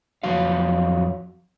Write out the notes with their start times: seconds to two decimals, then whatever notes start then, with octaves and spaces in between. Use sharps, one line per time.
0.23 F2 F#3 F#4 F5